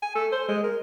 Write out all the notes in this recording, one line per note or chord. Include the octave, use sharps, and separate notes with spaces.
G#5
A4
C5
G#3
A#4